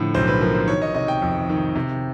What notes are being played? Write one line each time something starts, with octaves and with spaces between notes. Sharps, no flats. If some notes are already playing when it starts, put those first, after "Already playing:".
Already playing: A2 D3 F3
B1 C5
B4
F3 A#4
C5
D#3 C#5
D#5
C3 D#5
G5
F2
D#3
C3